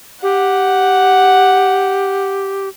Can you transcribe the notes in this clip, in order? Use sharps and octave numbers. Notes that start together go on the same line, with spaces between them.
G4 F#5